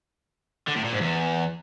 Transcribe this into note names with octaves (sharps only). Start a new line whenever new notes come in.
D3
A2
A#2
G#2
E2